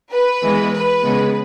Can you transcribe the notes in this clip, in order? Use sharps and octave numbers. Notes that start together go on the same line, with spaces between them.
B4
E3 G#3 B3
B4
C#3 G#3 B3